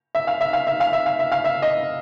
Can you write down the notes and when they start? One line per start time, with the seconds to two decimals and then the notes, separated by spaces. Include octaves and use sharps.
0.15 E5
0.27 F5
0.41 E5
0.53 F5
0.67 E5
0.80 F5
0.93 E5
1.06 F5
1.19 E5
1.32 F5
1.44 E5
1.62 D#5